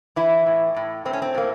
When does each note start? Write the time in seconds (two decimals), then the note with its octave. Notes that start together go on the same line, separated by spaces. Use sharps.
0.16 E3 E4
0.47 A2
0.76 A2
1.05 A2 C4
1.13 C#4
1.22 C4
1.34 A2 A#3